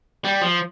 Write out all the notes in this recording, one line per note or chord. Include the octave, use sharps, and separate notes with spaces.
G3
F3